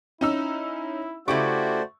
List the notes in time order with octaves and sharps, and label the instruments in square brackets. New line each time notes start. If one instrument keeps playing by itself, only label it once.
[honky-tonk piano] C#4 D#4 E6 [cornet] E4
[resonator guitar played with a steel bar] C#3 E4 G4 [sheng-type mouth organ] A3 C5 D5 [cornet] F#4 [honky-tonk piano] C#6